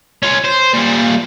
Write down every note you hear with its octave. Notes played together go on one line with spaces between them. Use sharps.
C#4 F4
C5
A#2 G3